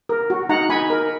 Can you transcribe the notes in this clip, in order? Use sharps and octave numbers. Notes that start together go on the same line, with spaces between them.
A#4
F#4
D#4 F#5 A#5
D#4 G#5 B5
A#4